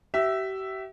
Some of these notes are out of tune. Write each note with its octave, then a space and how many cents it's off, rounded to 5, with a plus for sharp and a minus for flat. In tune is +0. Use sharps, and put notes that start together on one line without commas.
G4 -40 E5 +0